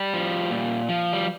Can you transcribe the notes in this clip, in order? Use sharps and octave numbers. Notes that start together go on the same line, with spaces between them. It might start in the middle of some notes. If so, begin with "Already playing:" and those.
Already playing: G3
F3
A#2
F3
G3